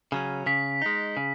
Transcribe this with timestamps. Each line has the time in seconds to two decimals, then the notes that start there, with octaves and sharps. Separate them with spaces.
0.12 C#3 F#3 C#4
0.46 C#3 B6
0.82 G#3 D#4
1.17 C#3